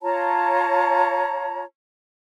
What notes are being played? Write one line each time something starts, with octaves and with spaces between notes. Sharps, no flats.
F4 C#5 A5 A#5